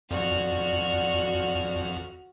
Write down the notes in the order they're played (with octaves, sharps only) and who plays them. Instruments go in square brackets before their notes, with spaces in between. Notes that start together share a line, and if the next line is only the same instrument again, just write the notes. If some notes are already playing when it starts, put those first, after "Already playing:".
[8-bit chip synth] F2 [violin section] F#4 F6 [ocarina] D5